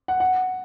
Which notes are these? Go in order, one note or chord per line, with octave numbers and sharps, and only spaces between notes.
F#5
F#5